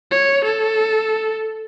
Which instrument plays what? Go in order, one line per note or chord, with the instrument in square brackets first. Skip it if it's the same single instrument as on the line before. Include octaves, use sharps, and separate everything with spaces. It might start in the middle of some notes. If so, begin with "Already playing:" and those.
[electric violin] C#5
A4